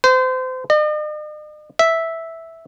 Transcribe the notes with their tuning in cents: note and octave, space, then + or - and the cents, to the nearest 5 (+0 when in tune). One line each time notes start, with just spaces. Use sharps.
C5 -30
D#5 -45
E5 -5